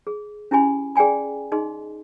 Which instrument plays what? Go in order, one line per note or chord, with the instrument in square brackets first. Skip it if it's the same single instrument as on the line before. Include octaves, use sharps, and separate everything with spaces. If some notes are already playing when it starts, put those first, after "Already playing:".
[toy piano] G#4
C#4 E4 G4 G#5 B5
G#4 D5 G5 G#5 B5
D#4 G#4 D#5 C6